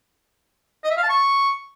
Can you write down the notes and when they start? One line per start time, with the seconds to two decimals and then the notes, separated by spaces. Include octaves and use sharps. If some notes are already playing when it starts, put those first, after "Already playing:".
0.84 D#5
0.90 E5
0.97 F5
1.03 A5
1.09 C#6